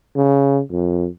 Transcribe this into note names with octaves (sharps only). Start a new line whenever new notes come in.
C#3
F2